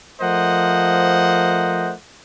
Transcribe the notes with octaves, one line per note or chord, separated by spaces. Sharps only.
F3 A3 A#4 C5 D#5 F#5